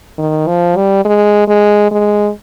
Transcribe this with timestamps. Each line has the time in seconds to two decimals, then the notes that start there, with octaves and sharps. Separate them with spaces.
0.18 D#3
0.47 F3
0.76 G3
1.05 G#3
1.48 G#3
1.91 G#3